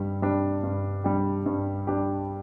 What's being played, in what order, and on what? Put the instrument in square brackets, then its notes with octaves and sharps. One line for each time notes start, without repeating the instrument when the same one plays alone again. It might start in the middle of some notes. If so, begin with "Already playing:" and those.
Already playing: [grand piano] G2 G3
G3 D4 G4
G2
G3 D4 G4
G2
G3 D4 G4